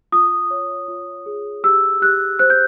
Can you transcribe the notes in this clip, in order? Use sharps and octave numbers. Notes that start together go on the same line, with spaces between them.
F4 D#6
C#5
F4
G#4
G4 E6
G4 F#6
C5 F#6
G6